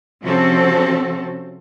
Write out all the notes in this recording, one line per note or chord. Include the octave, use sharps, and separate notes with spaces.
C3 F3 C4 C#4 F#4 A4